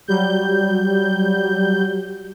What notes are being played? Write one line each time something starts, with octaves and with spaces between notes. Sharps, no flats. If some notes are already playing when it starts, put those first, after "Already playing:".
F#3 G3 G6